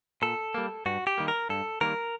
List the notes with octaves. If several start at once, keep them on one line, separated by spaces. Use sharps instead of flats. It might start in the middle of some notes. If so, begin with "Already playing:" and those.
A#2 A4
G3 A#3
G2 F#4
G4
D#3 G3 A#3
A#4
G2 A4
D#3 G3 A#3 A#4